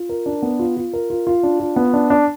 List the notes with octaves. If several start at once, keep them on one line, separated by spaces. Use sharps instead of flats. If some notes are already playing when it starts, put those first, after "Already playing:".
Already playing: F4
A#4
D4
B3
F4
F4
A#4
F4
F4
D4
F4
B3
D4
D4